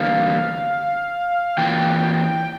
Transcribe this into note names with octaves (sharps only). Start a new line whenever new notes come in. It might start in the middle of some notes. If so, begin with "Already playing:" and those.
Already playing: E2 D3 G3 A#3 F5
E3 A#3 F4 G5